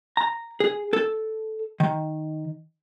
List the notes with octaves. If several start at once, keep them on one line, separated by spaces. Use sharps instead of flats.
A#5
G#4
A4
D#3